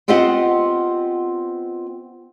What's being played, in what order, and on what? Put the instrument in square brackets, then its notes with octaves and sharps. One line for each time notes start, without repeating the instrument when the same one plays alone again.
[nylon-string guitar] B3 C4 F4 G4 D#5 F#5